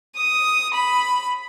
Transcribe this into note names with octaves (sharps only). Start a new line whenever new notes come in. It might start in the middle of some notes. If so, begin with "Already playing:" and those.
D#6
B5